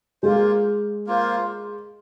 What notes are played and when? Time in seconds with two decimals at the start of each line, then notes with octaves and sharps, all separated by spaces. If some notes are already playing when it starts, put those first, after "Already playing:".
0.23 G#3 A#3 F4 C5
1.07 A#3 F4 C5